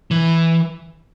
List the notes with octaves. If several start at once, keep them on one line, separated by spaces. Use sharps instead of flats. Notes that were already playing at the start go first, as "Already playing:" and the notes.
E3